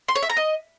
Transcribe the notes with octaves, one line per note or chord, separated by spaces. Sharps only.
C6
C#5
E5
A#5
D#5